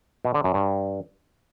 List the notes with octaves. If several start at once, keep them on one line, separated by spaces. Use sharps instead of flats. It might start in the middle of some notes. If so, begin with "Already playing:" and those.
B2
D3
F#2
G2